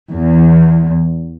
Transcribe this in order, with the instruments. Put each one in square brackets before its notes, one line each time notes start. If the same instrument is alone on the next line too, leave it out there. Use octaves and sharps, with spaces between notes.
[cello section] E2